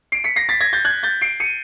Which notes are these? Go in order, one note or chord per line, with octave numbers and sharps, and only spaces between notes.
C7 D7
B6 C#7
A#6 C7
A6 B6
G#6 A#6
G6 A6
F#6 G#6
G6 A6
C7 D7
C#7 D#7